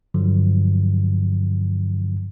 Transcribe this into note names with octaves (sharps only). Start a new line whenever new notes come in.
G2 D3 F3 F#3